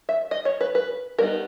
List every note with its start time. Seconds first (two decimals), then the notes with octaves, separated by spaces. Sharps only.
0.09 E5
0.31 D#5
0.45 C#5
0.61 B4
0.75 B4
1.19 G3 B3 D#4 A#4